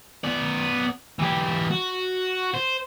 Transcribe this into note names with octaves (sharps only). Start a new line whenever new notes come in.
B3 D5
E3 G4
F#4
C5